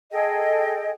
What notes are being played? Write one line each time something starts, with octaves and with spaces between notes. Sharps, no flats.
G#4 A4 D#5 G5